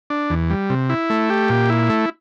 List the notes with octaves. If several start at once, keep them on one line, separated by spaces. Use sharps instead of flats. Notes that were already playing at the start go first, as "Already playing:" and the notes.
D4
E2
G3
C3
E4
A3
G4
A#2
E4
A3